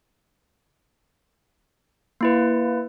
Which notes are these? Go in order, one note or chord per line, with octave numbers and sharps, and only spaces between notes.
A#3 E4 B4